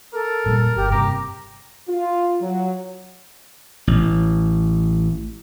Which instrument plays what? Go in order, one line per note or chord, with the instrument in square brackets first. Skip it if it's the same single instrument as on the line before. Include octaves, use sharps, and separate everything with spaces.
[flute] A4 [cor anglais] A#4
[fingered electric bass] A#2 G3
[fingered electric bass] G1 [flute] G4
[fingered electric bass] G2 C3 [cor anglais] G4 [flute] A#5
[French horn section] F4
F#3
[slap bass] A1